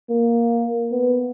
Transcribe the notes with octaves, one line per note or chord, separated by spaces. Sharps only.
A#3
B3